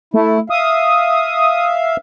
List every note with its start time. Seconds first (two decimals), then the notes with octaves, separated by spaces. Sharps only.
0.14 A3 E4
0.50 E5 F5 D#6